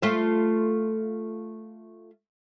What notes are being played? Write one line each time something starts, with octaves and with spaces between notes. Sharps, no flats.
A3 F4 E5